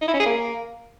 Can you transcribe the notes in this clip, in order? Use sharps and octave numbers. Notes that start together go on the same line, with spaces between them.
D#4
E4
C#4
G#4
A#3